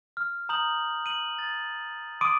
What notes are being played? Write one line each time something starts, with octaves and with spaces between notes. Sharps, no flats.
F6
A#5 D#6 G6 F#7
D#7 F#7
A6
C6 D6 D#6 D7 D#7